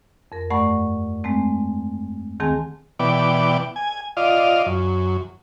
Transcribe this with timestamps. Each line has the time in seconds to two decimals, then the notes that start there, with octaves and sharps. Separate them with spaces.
0.32 F2 A#4
0.50 G2 A3 D5 F#5 A5 C#6
1.24 G#3 A3 C4
2.40 D2 D#3 C4 G#4 G#5 A5
2.99 B2 E3 B3 D5 G5 D6
3.76 G#5
4.17 F4 D5 D#5 F5
4.66 F#2